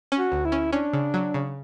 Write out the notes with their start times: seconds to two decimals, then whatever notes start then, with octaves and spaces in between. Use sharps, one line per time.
0.12 C#4
0.18 F#4
0.32 D2
0.45 E4
0.52 C#4
0.73 C#4 D4
0.93 C#3
1.14 F#3
1.34 C#3